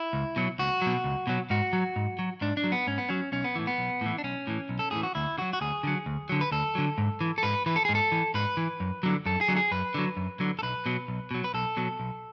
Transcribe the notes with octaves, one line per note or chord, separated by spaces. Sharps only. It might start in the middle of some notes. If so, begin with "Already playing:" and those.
Already playing: E4
C#2
B2 F#3
C#2 F#4
B2 F#3
C#2
B2 F#3
G#2 F#4
F#3
G#2
F#3
G#2 D4
D4
F#3
B3
G#2 C#4
B3
F#3 C#4
B1 C#4
B3
A2 E3
B3
B1
A2 E3
D4
B1 C#4
A2 E3
B1
A4
A2 E3 G#4
F#4
D2 E4
D3 F#3 F#4
F#4
D2 G#4
D3 F#3
D2
D3 F#3
B4
D2 A4
D3 F#3
G#2
E3
A4
G#2 B4
E3 B4
A4
G#2 G#4
A4
E3
G#2 B4
E3
F#2
D3 F#3
F#2 A4
G#4
D3 F#3
G#4
F#2 B4
D3 F#3
F#2
D3 F#3
A4
B1 B4
B2 F#3
B1
B2 F#3
B4
B1 A4
B2 F#3
B1